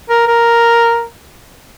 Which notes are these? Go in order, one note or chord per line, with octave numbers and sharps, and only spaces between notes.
A#4
A#4